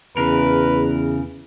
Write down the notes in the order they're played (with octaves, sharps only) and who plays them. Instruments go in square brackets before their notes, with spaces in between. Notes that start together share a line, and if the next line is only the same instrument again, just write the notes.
[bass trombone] E2 [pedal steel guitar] C#3 A#4 [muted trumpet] B4